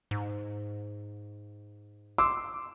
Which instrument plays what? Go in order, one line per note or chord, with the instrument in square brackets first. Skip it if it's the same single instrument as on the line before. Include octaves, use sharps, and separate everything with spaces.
[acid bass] G#2
[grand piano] C6 D6 E6